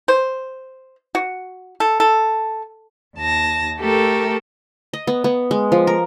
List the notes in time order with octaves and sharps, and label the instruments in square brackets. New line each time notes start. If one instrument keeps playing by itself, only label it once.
[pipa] C5
F#4
A4
A4
[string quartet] D#2 A5 A#6
A3 G4 A4 A#4
[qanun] D#5
B3
B3
G#3
F3
A#4